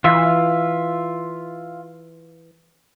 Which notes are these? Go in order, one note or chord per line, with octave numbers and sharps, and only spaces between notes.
E3 F4 E5